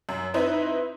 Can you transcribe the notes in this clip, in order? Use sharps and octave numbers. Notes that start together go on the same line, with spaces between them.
F#2
C4 D#4 E4 B4 C5